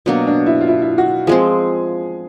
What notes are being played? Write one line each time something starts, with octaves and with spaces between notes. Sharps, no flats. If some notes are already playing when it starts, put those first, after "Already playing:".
B2 F#3 A#3 D4
D4
E4
F4
E4
E4
F#4
F3 G#3 C4 G#4